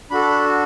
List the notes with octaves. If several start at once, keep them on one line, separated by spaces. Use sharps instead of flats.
D4 F#4 A4 B5